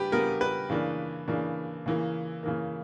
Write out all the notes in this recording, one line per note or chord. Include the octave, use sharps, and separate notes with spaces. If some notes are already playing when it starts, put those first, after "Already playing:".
Already playing: C#3 G3 D4 G4 B4
C#3 G3 B3 D4 A#4
B4
C#3 E3 A#3 D4
C#3 E3 A#3 D4
C#3 E3 A#3
C#3 E3 A#3